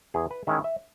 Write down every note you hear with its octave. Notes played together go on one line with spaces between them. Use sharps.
E2 G#4
B4
D#3 G#3 C#4 E4 E5
E5